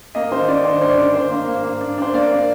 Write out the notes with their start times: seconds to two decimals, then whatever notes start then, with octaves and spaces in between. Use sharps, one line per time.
0.15 A#3 D#5
0.31 D#3 C5
0.48 D#3 D5
0.64 D4 C5
0.81 D4 C5
0.89 D5
0.98 D#3
1.14 D4 C5
1.30 A#3
1.48 A#3
1.64 A#3
1.81 D4
1.98 D4 C5
2.14 A#3 D5
2.31 A#3